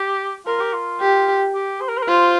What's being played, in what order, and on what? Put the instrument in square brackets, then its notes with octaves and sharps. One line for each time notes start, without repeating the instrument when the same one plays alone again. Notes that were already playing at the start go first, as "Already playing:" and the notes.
Already playing: [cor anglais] G4
[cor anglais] F4 [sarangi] A#4
[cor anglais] G4
F4
[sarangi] G4
[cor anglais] G4
C5
A#4
C5
A#4
[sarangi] F4 [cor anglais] C5